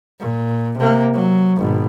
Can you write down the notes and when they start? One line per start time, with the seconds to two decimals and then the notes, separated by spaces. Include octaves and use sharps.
0.20 A#2
0.78 C3 A#3
1.14 F#3
1.56 G#1 B2